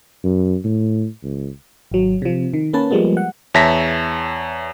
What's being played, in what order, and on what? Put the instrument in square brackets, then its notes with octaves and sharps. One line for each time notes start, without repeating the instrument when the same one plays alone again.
[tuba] F#2
A2
C#2
[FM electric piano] G#1 F#3
C3 F3
D#3
A#3 C#4 B4 A5
F3 G3 G#3 A#3 B3
F#5
[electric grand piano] E2 C#5 E5 A5 A#6 B6